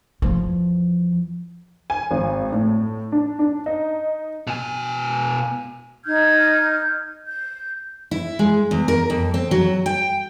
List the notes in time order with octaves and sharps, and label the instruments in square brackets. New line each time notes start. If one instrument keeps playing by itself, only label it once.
[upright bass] E2 F3
[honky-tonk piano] G#5
G#1
A2
D4
D4
D#4
[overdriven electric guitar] B2 G#5
[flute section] D#4 F6 G6 G#6
G6
[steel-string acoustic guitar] E4
G#3
E2
A#4
F2
C4
F#3
G5